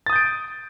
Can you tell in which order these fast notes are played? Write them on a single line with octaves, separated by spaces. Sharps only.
A6 D#6 G6 D7